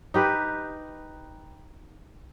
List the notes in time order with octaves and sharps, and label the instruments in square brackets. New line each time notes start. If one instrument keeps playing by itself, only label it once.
[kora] D#4 G4 B4